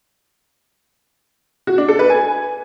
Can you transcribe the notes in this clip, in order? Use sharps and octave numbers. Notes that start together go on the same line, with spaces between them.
F#4
D4
A4
B4
G#5